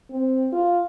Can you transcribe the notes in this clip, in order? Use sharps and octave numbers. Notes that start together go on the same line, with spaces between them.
C4
F4